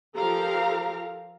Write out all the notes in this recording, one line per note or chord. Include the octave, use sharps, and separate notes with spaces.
F3 G4 A4 A#4 F5 A#5